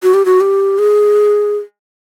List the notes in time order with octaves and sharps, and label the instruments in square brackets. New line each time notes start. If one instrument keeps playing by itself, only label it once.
[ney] F#4
G4
F#4
G4
G#4